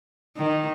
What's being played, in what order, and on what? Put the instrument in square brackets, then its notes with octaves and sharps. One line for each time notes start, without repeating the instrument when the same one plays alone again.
[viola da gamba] D#3